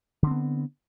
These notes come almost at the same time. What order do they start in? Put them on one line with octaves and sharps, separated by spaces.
D3 C4 B3